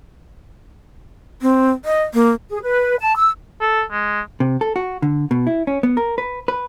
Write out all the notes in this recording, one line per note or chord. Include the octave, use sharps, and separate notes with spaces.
C4
D#5
A#3
G#4
B4
A5
E6
A4
G#3
C3
A4
F#4
D3
B2
E4
C#4
B3
A#4
B4
B4